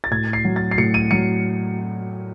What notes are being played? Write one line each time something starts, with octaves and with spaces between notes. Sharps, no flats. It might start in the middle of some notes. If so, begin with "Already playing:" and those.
A6
A2 G#6
C7
F#3
A6
C7
A2 C#7
D#7
F#3 C#7